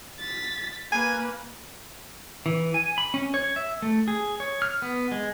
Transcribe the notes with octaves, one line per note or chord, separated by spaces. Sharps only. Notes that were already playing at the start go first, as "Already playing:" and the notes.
A6 B6
A#3 B4 G#5
E3
G#5
B5
C#4
C#5
E5
A3
G#4
C#5
F6
B3
G#3